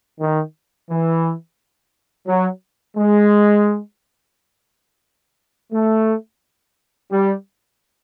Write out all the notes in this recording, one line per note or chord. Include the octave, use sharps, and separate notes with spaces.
D#3
E3
F#3
G#3
A3
G3